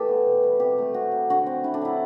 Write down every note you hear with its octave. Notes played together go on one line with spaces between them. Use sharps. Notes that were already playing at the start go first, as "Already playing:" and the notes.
Already playing: E3 A3 G4 A4
B3
B2
G3
C3 G4
A3
C4 F#4
F#3
D3 F#4
C4
D3 E4
D4
F#3 E4